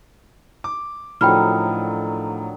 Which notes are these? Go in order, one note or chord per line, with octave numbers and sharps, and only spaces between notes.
D6
A2 D3 D#3 F3 F#3 G5 B5 F6